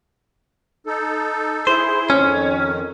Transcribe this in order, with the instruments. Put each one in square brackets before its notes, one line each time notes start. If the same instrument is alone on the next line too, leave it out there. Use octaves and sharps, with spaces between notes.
[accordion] D#4 A4
[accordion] E4 G#4 [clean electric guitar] C5
[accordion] F2 D#3 [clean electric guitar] C#4